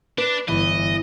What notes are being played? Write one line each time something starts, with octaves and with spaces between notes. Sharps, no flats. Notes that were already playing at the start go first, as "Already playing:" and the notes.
D4 B4
G1 E3 D#5